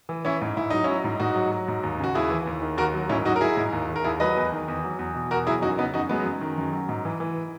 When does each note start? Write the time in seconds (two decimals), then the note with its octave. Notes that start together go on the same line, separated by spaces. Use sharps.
0.09 E3
0.25 E3 C#4 E4
0.41 G#2
0.57 G#2 E4
0.70 F#3 D#4
0.84 F#3 C#4 E4
1.04 G#2
1.20 G#2 D#4 F#4
1.36 F#3
1.52 F#3
1.68 G#2
1.83 D#2
1.99 C#3 F#4
2.15 D#2 E4 G#4
2.30 E3
2.47 D#2
2.62 D#3
2.78 D#2 F#4 A#4
2.94 F#3
3.09 G#2 C#4 E4
3.25 F#3 D#4 F#4
3.36 A#4
3.41 F#3 E4 G#4
3.57 G#2
3.73 D#2
3.89 D#3
3.96 A#4
4.04 D#2 E4 G#4
4.20 F#3 B4 D#5
4.37 E2
4.52 D#3
4.68 E2
4.84 F#3
4.99 E2
5.15 B2
5.31 E2 F#4 A#4
5.47 F#3 E4 G#4
5.62 F#2 D#4 F#4
5.78 C#3 B3 D#4
5.94 F#2 D#4 F#4
6.09 F#3 G#3 B3
6.25 F#2
6.41 D#3
6.58 F#2
6.73 F#3
6.89 G#2
7.05 E3
7.20 E3